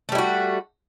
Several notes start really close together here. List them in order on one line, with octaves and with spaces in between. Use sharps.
A3 G3 E4 F#4